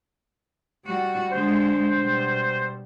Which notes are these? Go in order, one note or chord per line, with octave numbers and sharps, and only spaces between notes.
G3 F#4
D3 G#3 C5
B2 G3